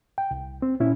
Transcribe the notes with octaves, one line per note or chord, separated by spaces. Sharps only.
G5
C2
C4
A#2 C#4 E4